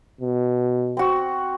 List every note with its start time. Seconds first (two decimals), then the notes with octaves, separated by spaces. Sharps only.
0.21 B2
0.97 C4 F#4